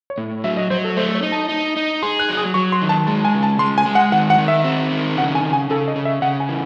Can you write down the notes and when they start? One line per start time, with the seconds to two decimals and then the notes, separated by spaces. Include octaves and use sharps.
0.10 C#5
0.18 A2
0.44 F#3 E5
0.57 D#5
0.70 F#3 C5
0.84 A4
0.97 A3 C5
1.15 C#5
1.23 D#4
1.32 A5
1.49 D#4
1.76 D#4
2.02 G#4 C6
2.20 F#6
2.29 F#3
2.37 D#6
2.54 F#3 C#6
2.72 C6
2.82 D#3
2.89 A5
3.07 G#3 A5
3.25 G#5
3.34 C#3
3.43 A5
3.59 G#3 C6
3.78 G#5
3.86 G#3
3.95 F#5
4.12 D#3 F#5
4.30 F#5
4.38 D#3
4.48 E5
4.64 C4
4.92 D#3
5.17 C#3 F#5
5.35 G#5
5.44 C#3
5.53 G#5
5.70 C#3 A4
5.88 D#5
5.96 C#3
6.05 E5
6.22 C#3 F#5
6.40 G#5
6.49 E3